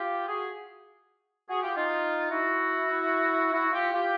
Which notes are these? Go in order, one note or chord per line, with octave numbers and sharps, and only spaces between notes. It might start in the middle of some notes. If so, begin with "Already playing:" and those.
Already playing: F4 G4
F#4 G#4
F#4 G#4
F4 G4
D#4 F4
E4 F#4
E4 F#4
F4 G4
F4 G4